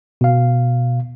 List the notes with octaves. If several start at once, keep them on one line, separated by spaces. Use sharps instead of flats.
B2 F5